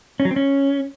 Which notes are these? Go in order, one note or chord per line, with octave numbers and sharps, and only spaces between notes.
C#4
F#3
C4
C#4